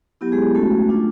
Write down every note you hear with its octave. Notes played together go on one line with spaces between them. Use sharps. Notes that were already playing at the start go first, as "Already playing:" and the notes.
F#3 B3 E4 G4
G#3 G#4
G#3 A3 C#4 F#4 A4
A3 D4 F4